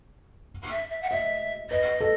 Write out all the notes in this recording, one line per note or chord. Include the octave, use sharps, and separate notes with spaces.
E5
E5
F#5
D#5 E5
B4 D#5
A4